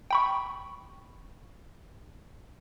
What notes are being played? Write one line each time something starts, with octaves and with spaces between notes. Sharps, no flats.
G5 B5 C#6